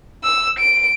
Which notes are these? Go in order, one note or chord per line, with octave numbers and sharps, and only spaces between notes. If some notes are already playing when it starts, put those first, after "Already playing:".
E6
D7